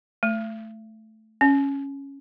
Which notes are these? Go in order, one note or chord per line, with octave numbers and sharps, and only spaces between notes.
A3
C#4